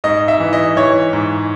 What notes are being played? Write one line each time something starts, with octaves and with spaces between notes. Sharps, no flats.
G#2 D#5
E5
E3
D#5
E3 C#5
G#2